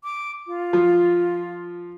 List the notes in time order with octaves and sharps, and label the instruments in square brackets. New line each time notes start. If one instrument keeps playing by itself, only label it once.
[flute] D6
F4
[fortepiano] F3